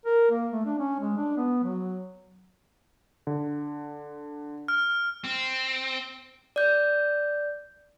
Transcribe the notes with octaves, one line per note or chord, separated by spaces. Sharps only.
A#4
A#3
A3
D4
C#4
G#3
D4
B3
F#3
D3
F6
C4
D5 G6